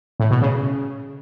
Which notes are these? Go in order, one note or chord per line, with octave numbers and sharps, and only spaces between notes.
A2
B2
C#3